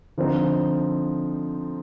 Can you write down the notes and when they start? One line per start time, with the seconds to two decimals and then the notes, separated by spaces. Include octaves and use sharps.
0.18 D3 F3 C4 D#4